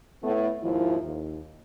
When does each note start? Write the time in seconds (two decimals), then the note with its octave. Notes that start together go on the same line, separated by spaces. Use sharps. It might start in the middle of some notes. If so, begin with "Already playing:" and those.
0.23 A2 A3 B3
0.63 D#2 G#2 F3 E4
1.04 D#2